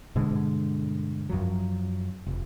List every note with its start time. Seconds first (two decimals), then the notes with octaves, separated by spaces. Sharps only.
0.15 G2 B2 D3 G#3
1.29 F#2 F3 F#3
2.26 F1